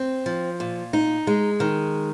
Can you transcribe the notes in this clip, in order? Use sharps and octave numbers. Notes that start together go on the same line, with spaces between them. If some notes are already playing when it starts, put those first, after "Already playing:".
Already playing: C4
F3
A#2
D#4
G#3
D#3